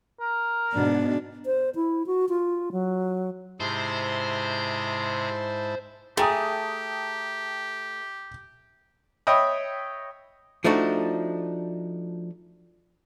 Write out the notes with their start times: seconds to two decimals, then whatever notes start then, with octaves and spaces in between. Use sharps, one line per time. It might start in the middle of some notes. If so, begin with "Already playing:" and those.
0.21 A#4
0.74 G#2 B2 D4
1.46 C5
1.75 E4
2.07 F#4
2.29 F4
2.72 F#3
3.60 G#2 C3 E4 G#4 C5 A5
6.17 A3 G4 G#4 G5 A#5 D#6
9.27 C#5 D#5 E5 G5 B5 D#6
10.64 F3 A3 D4 D#4 F#4